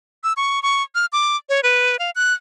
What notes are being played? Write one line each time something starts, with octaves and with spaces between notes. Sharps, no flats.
E6
C#6
C#6
F6
D6
C#5
B4
F5
F#6